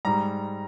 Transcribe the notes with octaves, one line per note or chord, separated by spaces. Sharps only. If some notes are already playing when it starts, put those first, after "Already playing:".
G#2 G3 A#5